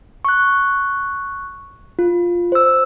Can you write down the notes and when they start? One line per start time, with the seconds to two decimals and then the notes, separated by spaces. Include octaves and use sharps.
0.25 C#6 F#6
1.99 F4
2.52 C5 E6